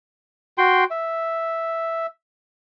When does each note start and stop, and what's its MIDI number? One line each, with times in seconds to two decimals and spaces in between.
0.58 0.84 66
0.58 0.84 79
0.58 0.84 84
0.91 2.07 76